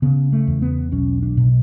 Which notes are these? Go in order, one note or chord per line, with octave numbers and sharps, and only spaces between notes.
C#3 B3
A3
E2
B3
B1 C#4
D4
B2